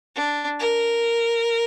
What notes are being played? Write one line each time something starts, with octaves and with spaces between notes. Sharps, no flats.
D4
A#4